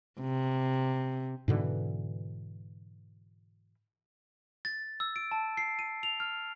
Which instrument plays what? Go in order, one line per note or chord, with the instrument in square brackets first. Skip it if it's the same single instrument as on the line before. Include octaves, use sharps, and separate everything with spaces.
[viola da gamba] C3
[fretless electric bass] G#2 B2 D3 E3
[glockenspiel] A6
E6
D7
A5
C7
D#7
F7
F6